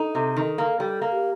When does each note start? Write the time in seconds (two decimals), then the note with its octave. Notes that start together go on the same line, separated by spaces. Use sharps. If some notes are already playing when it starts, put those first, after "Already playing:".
Already playing: D#4 A4
0.15 C3
0.36 D#3
0.58 A#3
0.79 G3 A4
1.02 A#3
1.12 G4